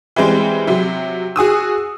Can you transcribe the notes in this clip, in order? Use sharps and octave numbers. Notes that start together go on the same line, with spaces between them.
E3 G3 G#3 C4
C3 F#3
F#4 G#4 D#6 E6